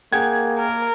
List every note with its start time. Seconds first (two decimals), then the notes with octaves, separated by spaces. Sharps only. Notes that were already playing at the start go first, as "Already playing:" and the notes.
0.13 A#3 G#4 F#5 G5 G#6
0.59 A#4